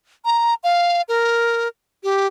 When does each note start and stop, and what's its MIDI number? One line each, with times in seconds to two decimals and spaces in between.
0.25 0.54 82
0.63 1.02 77
1.08 1.68 70
2.03 2.27 67